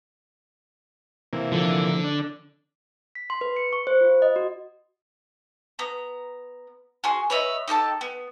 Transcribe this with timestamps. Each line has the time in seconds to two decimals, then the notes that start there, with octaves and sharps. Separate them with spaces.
1.33 C3 E3 A#3
1.52 D3 F3
2.04 D4
3.15 B6
3.30 C6
3.41 B4
3.56 C#7
3.73 C#6
3.87 C5
4.01 F4
4.22 D#5
4.36 F#4
5.79 B3 A#5
7.04 F#4 G#4 C6
7.30 B4 C#5 D#5 E5
7.68 D#4 G4 A4 A5
8.01 B3